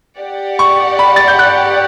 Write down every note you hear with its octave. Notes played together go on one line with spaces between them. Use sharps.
G4 D5 F#5
C#6
B5
A6
G6
F#6